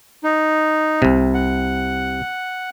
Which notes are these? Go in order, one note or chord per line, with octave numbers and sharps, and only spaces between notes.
D#4
C2 C3
F#5